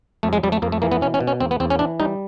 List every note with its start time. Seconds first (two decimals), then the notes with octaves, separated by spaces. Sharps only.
0.23 F2 A3
0.33 G#3
0.43 F2 G3
0.52 A3
0.62 F2 A#3
0.72 A3
0.82 E3 A#3
0.92 B3
1.01 B2 C#4
1.14 C#4
1.20 B2
1.27 C#4
1.40 E2 C4
1.51 B3
1.60 E2 C4
1.70 C#4
1.79 E3 D4
2.00 G3 D#4